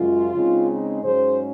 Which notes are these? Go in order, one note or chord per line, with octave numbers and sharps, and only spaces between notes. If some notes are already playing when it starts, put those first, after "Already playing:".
Already playing: F#2 C#3 G#3 F4
C#3 G#3 C4 D#4
D#4
G#2 F#3 C#4 G#4 C5